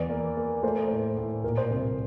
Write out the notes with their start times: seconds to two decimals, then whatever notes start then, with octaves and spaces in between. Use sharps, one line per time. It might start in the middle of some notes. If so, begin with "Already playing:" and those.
Already playing: E2 D5
0.10 A#3
0.37 A#3
0.63 A3 C5
0.76 A#4
0.88 A2 C5
1.17 A2
1.44 A#2 A#4
1.57 C5
1.71 C2 A#4